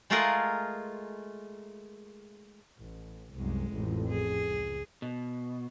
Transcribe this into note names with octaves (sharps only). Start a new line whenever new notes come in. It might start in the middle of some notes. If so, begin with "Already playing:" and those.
G#3 A3 F4 G#4 A#4 F#5
A1
C2 F#2 G#3
A1 F2
G#4
C#2
B2